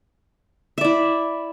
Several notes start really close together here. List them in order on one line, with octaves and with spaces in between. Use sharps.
E5 D5 E4